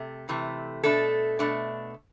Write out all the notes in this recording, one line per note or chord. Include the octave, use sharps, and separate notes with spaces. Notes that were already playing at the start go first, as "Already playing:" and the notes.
Already playing: C3 A3
C3 E3 A3
B2 A3 D4 A4
B2 A3 D4